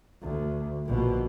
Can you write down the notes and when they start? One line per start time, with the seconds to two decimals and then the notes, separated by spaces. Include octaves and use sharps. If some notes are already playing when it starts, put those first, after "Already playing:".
0.22 D2
0.85 A#1 B2